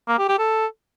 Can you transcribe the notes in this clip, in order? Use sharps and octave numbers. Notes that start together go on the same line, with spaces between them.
A#3
G4
G4
A4